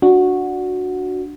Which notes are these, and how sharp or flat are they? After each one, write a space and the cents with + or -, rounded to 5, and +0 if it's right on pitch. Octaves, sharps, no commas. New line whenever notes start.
D4 +0 F#4 -10